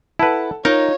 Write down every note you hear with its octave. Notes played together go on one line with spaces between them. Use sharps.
E4 A4 B4 F#5 A5
D#4 F4 A#4 C#5